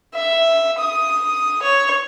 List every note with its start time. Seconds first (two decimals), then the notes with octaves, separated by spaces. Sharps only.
0.15 E5
0.79 D#6
1.62 C#5